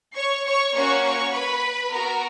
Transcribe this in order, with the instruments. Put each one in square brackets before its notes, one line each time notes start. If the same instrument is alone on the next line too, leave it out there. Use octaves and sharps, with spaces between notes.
[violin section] C#5 C#6
C#5 C#6
A#3 C#4 F#4 C#5 C#6
C#5 C#6
B4 B5
B3 F#4 A#4 A#5